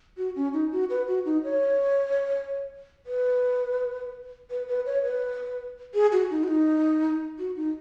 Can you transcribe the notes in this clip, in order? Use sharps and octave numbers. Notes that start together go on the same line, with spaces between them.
F#4
C#4
D#4
F#4
B4
F#4
D#4
C#5
B4
B4
B4
C#5
B4
G#4
F#4
D#4
F#4
D#4
F#4
D#4